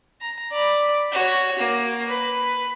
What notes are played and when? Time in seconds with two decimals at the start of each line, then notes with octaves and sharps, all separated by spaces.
0.21 A#5
0.52 D5 B5
1.12 F#4 C#5
1.59 A#3
2.07 B4